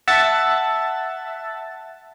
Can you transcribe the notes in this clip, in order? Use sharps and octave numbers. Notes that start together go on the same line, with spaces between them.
E5 F#5 A5 A6